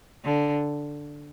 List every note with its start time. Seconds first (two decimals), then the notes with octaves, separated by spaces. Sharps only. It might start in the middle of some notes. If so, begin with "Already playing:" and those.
0.25 D3